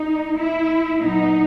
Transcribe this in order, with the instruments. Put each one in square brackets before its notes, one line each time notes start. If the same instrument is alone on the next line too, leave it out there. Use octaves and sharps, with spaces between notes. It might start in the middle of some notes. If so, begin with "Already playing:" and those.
Already playing: [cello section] D#4
E4
A#2 F#3 B3 D#4